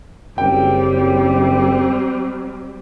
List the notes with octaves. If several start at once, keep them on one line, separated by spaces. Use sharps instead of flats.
F#1 G3 C4 G5